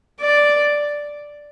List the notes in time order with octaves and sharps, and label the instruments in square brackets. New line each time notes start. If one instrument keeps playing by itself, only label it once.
[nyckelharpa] D5